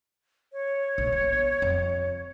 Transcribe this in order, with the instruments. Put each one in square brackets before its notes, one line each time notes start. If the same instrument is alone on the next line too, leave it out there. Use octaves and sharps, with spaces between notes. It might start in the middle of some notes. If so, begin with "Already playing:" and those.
[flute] C#5
[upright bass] A#1
B3
F2